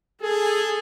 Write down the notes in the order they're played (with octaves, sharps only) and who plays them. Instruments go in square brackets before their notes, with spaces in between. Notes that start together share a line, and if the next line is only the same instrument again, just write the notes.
[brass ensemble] G#4 [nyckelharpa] A4